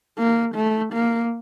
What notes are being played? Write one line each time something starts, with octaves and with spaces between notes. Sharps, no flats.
A#3
A3
A#3